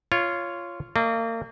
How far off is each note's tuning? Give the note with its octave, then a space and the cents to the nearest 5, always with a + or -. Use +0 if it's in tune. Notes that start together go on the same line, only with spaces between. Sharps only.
F4 -10 C#5 +5
A#3 -35 D#5 -35